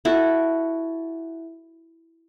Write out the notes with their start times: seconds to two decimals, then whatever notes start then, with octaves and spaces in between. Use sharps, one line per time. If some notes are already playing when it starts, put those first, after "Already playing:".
0.05 E4 F#4 A4